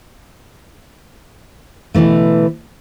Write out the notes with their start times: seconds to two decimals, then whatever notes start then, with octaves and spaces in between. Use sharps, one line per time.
1.94 B2 D3 E3 A3